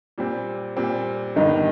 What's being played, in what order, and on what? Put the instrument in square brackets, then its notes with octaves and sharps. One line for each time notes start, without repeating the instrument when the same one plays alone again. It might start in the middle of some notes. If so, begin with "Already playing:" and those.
[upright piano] A#2 G3 C4
A#2 G3 C4
[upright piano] G1 G2 D#3 [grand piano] D#4